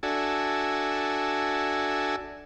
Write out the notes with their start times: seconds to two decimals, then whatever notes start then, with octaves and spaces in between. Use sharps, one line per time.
0.03 D4 F#4 A4 E5 G#5